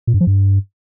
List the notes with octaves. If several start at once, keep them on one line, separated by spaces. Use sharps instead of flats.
A#2
G2
F3
G2